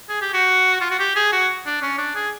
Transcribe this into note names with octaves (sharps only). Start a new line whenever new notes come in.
G#4
G4
F#4
F4
F#4
G4
G#4
F#4
D4
C#4
D4
G#4